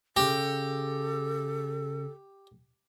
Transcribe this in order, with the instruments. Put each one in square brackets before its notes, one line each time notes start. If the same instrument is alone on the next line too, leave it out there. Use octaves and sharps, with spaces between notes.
[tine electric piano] C#3 A#6 [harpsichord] G4 [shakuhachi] A4